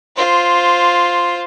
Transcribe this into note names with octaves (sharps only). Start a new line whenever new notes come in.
F4 C5